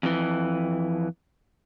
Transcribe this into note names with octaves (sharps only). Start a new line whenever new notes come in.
F2 E3